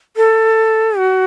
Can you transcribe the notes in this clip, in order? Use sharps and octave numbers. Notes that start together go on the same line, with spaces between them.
A4
F#4